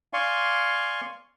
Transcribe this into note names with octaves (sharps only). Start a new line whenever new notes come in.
D5 F5 G#5 C6 C#6